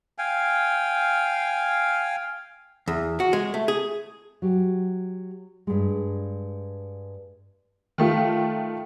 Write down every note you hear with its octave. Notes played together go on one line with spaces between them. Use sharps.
F5 G5 G#5
E2
F#4
G#3
A3
G#4
F#3 G4
G2 G#3
D#3 A3 F4